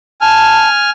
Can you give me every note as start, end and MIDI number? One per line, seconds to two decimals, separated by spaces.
0.21 0.90 80
0.21 0.68 81
0.21 0.90 89